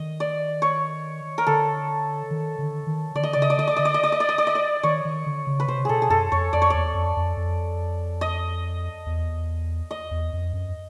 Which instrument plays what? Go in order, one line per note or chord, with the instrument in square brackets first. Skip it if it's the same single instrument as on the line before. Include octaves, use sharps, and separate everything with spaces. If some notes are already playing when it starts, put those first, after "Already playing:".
Already playing: [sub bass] D#3 [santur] D#5
[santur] D5
C#5
A#4
[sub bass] D3 [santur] A4
[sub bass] D#3
D3
D#3
[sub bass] D3 [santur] D5
[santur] D#5
[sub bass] C#3 [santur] D5
[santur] D#5
D5
[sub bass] D3 [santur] D#5
[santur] D5
[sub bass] D3 [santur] D#5
[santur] D5
D#5
D5
D#5
D5
D#5
D5
D#5
D5
[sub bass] D#3 [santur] C#5
[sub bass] D#3
D3
C#3
[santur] B4
[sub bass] C3 [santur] C5
[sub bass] B2 [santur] G#4 A4
[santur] G#4
[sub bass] F#2 [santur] A4
[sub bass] F2 [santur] C#5
[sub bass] F2 [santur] D5
[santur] C#5
[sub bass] E2 [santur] D5
[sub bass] F2
F2
F2
[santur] D#5
[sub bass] E2
[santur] D#5
[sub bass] E2
F2
F#2